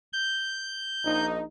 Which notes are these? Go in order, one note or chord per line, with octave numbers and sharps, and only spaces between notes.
G6
A#1 D#4